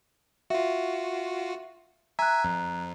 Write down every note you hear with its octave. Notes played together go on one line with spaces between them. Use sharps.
F4 F#4 E5
E5 G#5 A#5 F#6
F2